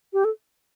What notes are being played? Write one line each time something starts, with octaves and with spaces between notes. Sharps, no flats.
G4
A4